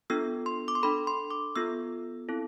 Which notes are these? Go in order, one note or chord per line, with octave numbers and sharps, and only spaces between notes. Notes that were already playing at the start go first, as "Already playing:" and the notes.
B3 D4 F4 A4 E6
C6
D6
C6
D4 A4 B5
C6
D6
B3 F4 A4 E6
C4 E4 A4